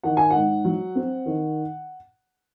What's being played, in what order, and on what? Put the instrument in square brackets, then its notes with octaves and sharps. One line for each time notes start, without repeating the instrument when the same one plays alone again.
[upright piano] D#3 F#5
G#5
G#2 F#5
F#3
C4
D#3